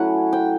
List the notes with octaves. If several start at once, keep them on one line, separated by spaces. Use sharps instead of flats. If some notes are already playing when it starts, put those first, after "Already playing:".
Already playing: F#3 A3 C#4 E4 F#5
G5